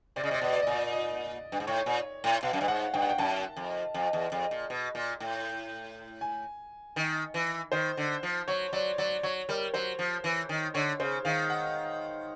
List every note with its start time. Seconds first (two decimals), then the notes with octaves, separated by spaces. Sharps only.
0.16 C3 D5
0.23 C#3 D#5
0.31 C3
0.34 D5
0.42 B2 D#5
0.53 D5
0.62 D#5
0.67 A#2 D5
0.92 D#5
1.52 G2
1.60 G#2
1.67 A2 C#5
1.86 A#2
2.24 A2
2.43 B2 F5
2.53 F#2
2.61 G2
2.68 G#2 F#5
2.94 G2 G5
3.02 F#5
3.09 G5
3.18 F#2 A5
3.56 F2
3.94 F2
4.13 E2
4.32 F2
4.51 A#2
4.70 B2
4.95 A#2
5.20 A2
6.21 G#5
6.96 D#3
7.34 E3
7.72 D#3 C5
7.97 D3
8.23 F3
8.48 F#3 C#5
8.73 F#3 D5
8.98 F#3 D5
9.23 F#3 C#5
9.49 G3 A#4
9.74 F#3 C5
9.99 F3
10.24 E3
10.49 D#3
10.74 D3 C#5
11.00 C#3 C5
11.25 D#3 F5
11.50 F#5